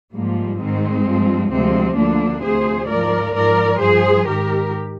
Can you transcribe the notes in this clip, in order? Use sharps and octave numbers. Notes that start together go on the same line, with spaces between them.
G#2 F3 G3 A#3
G#2 D#3 G#3 C4
G2 F3
D2 C3 F3 G#3 C4
D2 D3 F3 A#3 D4
D2 C3 F3 G#4 C5
G#2 F3 A#4 D5
G#2 F3 A#4 D5
G2 F3 G#4 C5
G#2 D#3 G4 A#4